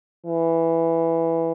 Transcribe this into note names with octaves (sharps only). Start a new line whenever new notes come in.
E3